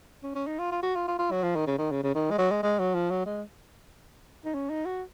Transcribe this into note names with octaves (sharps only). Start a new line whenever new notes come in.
C#4
C#4
D#4
F4
F4
F#4
F4
F4
F4
F#3
F3
D#3
C#3
D#3
C#3
C#3
D#3
G#3
F#3
G#3
G#3
F#3
F3
F#3
G#3
D#4
C#4
D#4
F#4